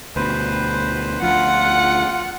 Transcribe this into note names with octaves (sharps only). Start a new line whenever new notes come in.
D2 B2 B4 C5
D2 F3 F4 F#5